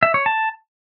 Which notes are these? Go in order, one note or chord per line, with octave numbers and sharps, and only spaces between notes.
E5
C#5
A5